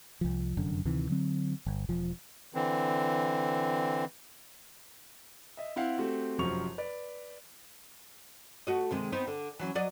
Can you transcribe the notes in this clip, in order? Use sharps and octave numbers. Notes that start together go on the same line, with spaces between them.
C2 F3
F1 F#2 D3
D2 C3 D#3 E3
D3 F#3 C4
G1
E1 F3
D3 E3 C4
D#5 E5
C4 E4 F5 F#5
A3 C4 F#4 G4
F1 F#2 F3 F#4 C#6 F7
B4 D5
A3 F#4 D#5
C3 D#3 G#3
B3 C4 D#4
D3
E3 F#3 C#4
F#3 D5 D#5